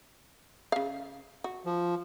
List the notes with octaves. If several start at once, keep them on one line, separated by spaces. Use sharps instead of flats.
C#3 F5
F#4
F3